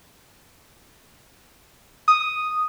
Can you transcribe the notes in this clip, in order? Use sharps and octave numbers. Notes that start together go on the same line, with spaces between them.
D#6